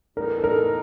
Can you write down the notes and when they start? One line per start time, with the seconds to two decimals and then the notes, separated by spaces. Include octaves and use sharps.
0.16 A2 E3 G#3 B3 D#4 A#4
0.38 A4
0.44 A#4